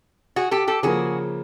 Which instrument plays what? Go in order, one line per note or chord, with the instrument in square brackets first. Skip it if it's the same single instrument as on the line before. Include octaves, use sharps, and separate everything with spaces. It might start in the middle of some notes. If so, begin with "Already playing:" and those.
[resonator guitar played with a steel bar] F#4 G#4
G4 A4
G4 A4
[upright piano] C#3 F3 A#3 [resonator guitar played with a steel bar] F#4 G#4